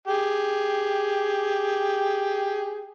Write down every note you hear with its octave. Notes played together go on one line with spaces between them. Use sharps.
G4 G#4